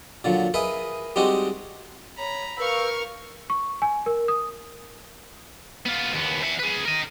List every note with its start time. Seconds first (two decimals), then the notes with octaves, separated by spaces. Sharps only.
0.24 A#2 D3 F#3
0.54 G#4 A#4 B4 D#5 E5
1.16 G3 G#3 C4 D#4 F#4 G4
2.17 C#5 A#5 B5
2.58 A#4 B4 F5 C#6 E6 F6 G6
3.50 C#6
3.82 G#5
4.06 A#4
4.28 D#6
5.86 B3 F4
6.13 D#2 B3
6.44 E5 F#5
6.60 G#4 B4
6.85 A#4 D#5